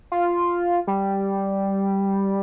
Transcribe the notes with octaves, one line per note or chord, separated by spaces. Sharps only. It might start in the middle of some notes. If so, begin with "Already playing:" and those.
F4
G3